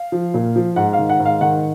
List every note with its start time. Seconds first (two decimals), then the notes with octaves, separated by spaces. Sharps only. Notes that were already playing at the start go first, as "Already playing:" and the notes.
Already playing: F5
0.12 F3
0.34 A#2
0.56 F3
0.76 G#2 F#5
0.93 F5
0.98 D#3
1.09 F#5
1.19 G#2
1.25 F5
1.41 D#3 F#5